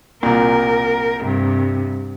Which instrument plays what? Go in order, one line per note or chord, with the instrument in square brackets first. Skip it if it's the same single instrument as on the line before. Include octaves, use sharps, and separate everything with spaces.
[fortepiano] C2 A#2 [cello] A#4
[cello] G2 C3